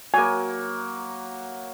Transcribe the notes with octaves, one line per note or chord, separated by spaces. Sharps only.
F#3 A#3 G#5